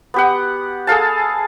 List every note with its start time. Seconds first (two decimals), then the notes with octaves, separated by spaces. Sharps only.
0.14 B3 G4 F#5
0.87 G#4 A4 F5 A5